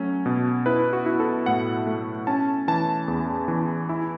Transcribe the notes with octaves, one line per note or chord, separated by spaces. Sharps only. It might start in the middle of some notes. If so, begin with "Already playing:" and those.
Already playing: F#3 A3 C#4
B2
E4 B4
F#4
E4
A4
A2 F#5
A3
C#4 A5
E3 A5
E2
E3
E4